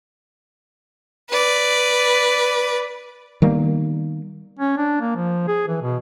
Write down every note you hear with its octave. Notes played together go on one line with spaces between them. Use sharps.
B4 D5
D#3 G3 A#3 B3
C#4
D4
A#3
F3
G#4
E3
B2